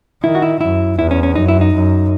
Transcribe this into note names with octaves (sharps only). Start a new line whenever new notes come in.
D#3 E4
F#4
E4
F#2 E4
E2 E4
C#4
C#4
F#2 D#4
E4
D#4
F#2